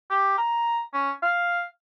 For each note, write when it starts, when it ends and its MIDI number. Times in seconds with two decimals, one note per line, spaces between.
0.10 0.37 67
0.38 0.82 82
0.94 1.11 61
1.23 1.64 77